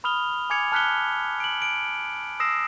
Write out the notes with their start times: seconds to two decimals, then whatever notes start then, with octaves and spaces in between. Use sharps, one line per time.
0.04 B5 D#6 F6 F7 G7
0.50 G#5 D6 G#6 C#7 F7
0.72 A5 F6 F#6 B6 C#7 G7
1.40 D7 F#7
1.62 D7
2.40 D#6 E6 A#6 C7 E7